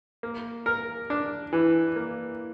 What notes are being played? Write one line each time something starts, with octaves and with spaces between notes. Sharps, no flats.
A#3
A#4
D4
E3
A#3